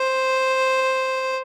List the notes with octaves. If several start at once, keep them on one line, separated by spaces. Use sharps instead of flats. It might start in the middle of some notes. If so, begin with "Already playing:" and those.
Already playing: C5